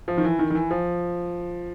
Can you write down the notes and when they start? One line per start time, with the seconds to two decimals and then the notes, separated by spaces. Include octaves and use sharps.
0.08 F3
0.17 D#3
0.24 E3
0.39 D#3
0.50 D#3
0.55 E3
0.71 F3